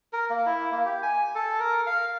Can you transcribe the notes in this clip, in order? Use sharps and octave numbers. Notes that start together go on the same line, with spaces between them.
A#4
A#3
E4
A#3
G4
G#5
A4
A#4
F5